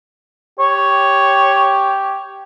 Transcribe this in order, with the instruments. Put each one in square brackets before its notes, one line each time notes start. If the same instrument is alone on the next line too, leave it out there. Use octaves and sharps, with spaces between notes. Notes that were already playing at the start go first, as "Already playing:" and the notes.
[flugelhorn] G4 [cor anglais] C#5